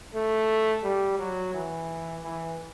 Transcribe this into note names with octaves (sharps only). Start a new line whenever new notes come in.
A3
G3
F#3
E3
E3